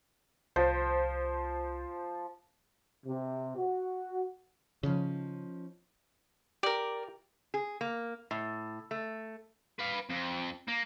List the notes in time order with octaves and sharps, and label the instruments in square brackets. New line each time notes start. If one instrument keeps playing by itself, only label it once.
[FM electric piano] C2 [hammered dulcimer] F3 [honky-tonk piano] C5
[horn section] C3
F#4
[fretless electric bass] C#3 [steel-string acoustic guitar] F3 C#4 D#4
[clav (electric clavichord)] G4 [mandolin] A#4 D5
[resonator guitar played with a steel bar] G#4
A#3
A2
A3
[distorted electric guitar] B4 F5
F2
A#3